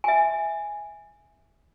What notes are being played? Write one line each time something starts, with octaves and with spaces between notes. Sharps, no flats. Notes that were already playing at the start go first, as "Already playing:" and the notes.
E5 G#5